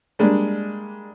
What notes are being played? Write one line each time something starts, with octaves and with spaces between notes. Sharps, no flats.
G3 G#3 A#3 D4